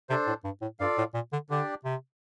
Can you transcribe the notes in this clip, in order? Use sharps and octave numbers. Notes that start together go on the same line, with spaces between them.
C3 D4 A4 C5
A2
G2
A2
G2 F4 A4 D5 F5
A2
A#2
D3
D3 D4 G4 D5
C3